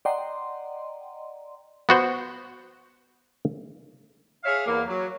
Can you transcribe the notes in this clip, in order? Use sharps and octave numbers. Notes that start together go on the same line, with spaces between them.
D5 D#5 F#5 G5 A#5 C6
B3 F#4 C5
G#4 C#5 E5 F5
E2 A#3
F#3